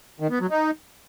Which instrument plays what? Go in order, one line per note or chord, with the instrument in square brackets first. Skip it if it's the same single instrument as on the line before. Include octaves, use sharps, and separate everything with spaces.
[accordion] D#3
B3
F#3
D#4